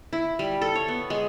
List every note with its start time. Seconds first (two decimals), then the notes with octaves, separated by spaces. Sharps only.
0.13 E4
0.39 G3
0.62 A4
0.75 C#5
0.88 B3
1.10 G#3